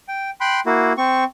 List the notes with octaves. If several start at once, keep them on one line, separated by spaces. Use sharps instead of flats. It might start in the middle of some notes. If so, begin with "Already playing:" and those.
G5
G5 B5 C6 F#6
A#3 E4 F#4
C4 C#6